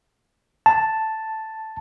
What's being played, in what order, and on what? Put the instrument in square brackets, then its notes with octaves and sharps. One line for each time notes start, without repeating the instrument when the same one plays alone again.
[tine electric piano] A5